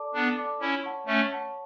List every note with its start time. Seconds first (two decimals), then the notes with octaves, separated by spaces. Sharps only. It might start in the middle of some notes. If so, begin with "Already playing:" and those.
Already playing: A4 D5 A5 D6
0.14 B3 D4 A4
0.37 D5 A5 D6
0.61 C#4 E4 C#5
0.84 F#5 A5 C#6
1.07 A3 C#4 C#5
1.30 F#5 A5 C#6